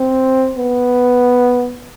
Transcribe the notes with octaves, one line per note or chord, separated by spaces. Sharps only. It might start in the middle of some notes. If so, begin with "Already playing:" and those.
Already playing: C4
B3